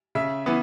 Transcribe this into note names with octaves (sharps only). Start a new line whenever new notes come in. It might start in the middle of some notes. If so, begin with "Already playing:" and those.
C#3 E5
E3 B3